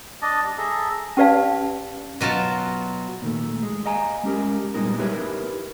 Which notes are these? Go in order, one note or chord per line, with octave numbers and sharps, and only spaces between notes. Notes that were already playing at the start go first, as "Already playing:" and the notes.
D4 D#5 A5
G3
G#4 A4 E5 A#5
C#4 G4 B4 D5 F5 A5
B2 F#3 F4 A5
A#2 D#3 A3
G#3
D#5 F5 G#5 A#5
G#3 C#4 G4 A#4
A#2 G3 G#3 B3 D#4 A#4
D#4 E4 G4 A#4 B4 C#5